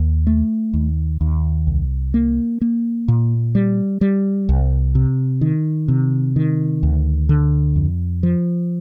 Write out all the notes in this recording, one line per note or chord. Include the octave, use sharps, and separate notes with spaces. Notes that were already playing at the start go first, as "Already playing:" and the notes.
Already playing: D#2
A3
D#2
D#2
C2
A#3
A#3
A#2
G3
G3
C2
C3
D#3
C3
D#3
D2
D3
F2
F3